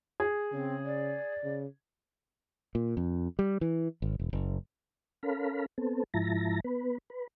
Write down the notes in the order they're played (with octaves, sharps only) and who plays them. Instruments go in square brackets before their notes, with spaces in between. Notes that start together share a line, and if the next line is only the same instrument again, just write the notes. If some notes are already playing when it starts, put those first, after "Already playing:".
[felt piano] G#4
[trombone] C#3 [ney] C4
[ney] D5
[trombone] C#3
[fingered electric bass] A#2
F2
G3
E3
G#1
E1
F#1
[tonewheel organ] C#4 A4 A#4 F5 B5
B3 C4 A4
G#2 F3 E4 A5 A#5 A#6
B3 B4
B4